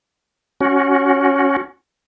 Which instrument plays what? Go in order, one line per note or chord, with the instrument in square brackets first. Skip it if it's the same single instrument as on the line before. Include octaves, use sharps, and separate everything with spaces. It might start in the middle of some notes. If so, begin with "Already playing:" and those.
[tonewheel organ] C#4 F#4